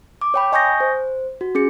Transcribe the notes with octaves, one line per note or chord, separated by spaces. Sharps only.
D6
C#5 G5 B5
D#5 G#5 C#6 D#6 G6 A#6
C5
F#4
C#4 G#4 C#7